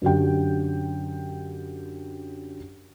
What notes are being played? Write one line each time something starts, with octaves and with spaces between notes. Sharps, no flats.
F#2 D3 G4 G5